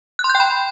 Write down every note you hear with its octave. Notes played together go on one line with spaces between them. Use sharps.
F#6
C6
G6
G5
B5